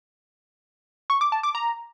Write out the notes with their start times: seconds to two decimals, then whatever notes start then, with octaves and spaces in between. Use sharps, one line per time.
1.10 C#6
1.21 D6
1.32 A5
1.43 D6
1.55 A#5